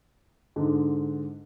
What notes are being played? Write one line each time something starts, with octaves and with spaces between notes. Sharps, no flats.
G#2 D3